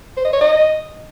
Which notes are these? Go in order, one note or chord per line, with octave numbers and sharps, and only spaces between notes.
C5
D#5
C#5
D#5